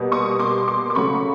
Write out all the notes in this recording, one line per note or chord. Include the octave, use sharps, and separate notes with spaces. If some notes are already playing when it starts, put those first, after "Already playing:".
Already playing: B2 G3 A#3
C#6 D#6
C6 D6
C6 D6
D6
C#3 F#3 A3 B5 C#6